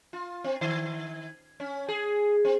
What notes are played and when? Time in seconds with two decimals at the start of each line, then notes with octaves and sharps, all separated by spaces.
0.13 F4
0.44 C4
0.61 D#3
1.60 C#4
1.88 G#4
2.45 C4